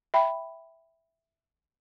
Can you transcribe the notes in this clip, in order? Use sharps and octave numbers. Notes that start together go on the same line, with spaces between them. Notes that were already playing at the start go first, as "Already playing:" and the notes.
E5 G5 B5